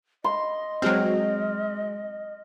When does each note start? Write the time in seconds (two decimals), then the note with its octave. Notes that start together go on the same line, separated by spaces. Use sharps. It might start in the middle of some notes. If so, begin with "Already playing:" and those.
0.24 D#5 C6
0.82 F#3 G#3 C4 F6